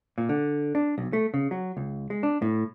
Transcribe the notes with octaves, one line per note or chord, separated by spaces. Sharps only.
A#2
D3
D4
B1
A3
C#3
F#3
C#2
G#3
D4
A2